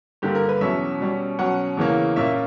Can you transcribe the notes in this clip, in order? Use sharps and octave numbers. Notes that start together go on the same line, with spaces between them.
G2 D3 A#3 G4
A#4
B4
E2 B2 F#3 C#4 E5
B2 G3 C#4
B2 F#3 C#4 F#5
E2 C#3 E3 A#3 C#4
A#2 A#3 C#4 E5